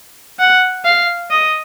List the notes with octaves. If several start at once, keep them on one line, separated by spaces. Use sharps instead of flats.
F#5
F5
D#5